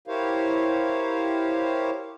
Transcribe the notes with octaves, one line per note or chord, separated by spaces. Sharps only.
E4 G4 A#4 C5 C#5 F5